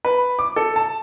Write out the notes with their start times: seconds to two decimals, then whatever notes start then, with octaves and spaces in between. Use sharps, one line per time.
0.05 B4
0.39 D6
0.56 A4
0.76 A5